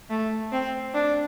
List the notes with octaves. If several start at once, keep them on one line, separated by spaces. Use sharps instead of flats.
A3
C4
D4